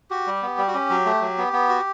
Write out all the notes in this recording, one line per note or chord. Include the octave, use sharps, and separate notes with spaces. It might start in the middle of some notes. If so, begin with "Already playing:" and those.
F#4 G4
G3
B3
G3
F#4
C#4 G4
F#3
A3
F#3
B3
B3
F#4